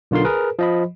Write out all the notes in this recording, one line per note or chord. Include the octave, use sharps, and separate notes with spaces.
B1 D3 F4 A#4 C6
G#4 A#4 B4
F3 D#5 B5